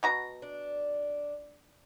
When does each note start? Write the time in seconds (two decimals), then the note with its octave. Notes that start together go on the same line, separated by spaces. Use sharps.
0.03 B2 F#4 A#5
0.42 D4